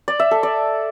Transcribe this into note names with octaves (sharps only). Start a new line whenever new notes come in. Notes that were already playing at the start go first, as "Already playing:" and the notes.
D5
E5
A4
D5